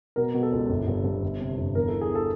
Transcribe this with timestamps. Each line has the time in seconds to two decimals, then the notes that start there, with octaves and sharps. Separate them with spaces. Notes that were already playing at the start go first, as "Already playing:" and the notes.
0.16 B2 A#4
0.34 B2
0.43 A4
0.52 C#2
0.69 G1
0.88 G2
1.04 G2
1.22 G1
1.40 C3
1.58 G1
1.75 E2 A#4
1.88 A4
1.93 E3
2.01 G#4
2.15 A4